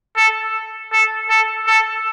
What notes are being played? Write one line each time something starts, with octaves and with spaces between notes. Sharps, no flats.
A4
A4
A4
A4